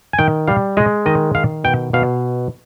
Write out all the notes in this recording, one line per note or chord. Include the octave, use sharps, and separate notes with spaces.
G#5
D#3 G5
G3 F5
G#3 D#5
D#3 D#5
D#3 F5
B2 G5
B2 F5